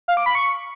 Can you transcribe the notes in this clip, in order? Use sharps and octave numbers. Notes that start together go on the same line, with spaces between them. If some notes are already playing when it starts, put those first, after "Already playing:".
F5
D6
B5
C#6